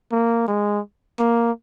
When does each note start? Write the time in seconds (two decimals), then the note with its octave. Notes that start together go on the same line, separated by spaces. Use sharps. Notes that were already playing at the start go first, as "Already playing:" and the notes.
0.12 A#3
0.48 G#3
1.19 A#3